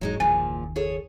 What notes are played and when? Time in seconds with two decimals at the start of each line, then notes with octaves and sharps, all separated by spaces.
0.01 E1 G#2 F#3 G#3 D#4
0.20 F#1 D#2 A#2 F3 G#5 A6
0.76 G#4 A4 C#5